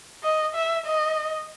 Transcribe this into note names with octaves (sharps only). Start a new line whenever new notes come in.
D#5
E5
D#5